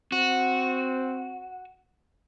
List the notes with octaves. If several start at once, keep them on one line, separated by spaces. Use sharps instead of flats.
C4 F#4